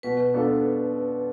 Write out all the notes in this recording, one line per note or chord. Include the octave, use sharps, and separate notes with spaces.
B2 B4
B3 D4 F4 A4